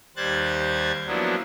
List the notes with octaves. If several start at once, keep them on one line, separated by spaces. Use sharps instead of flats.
D#2 G3 C5 F#6 G#6 A6
F3 F#3 A#3 B3 D4 E4